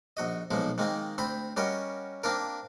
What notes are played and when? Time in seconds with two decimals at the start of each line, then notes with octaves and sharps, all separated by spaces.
0.17 A#1 F#4 D#5
0.51 B1 A#2 F3 G#3
0.78 D#3 G#3 A#3 C4
1.18 D2 C4 C5 B5
1.57 G3 C#4 F#4 A#4 D#5
2.24 A#3 C4 D4 F4 A#4